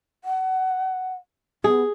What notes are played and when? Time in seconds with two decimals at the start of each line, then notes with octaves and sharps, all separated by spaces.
0.24 F#5
1.64 B3 G#4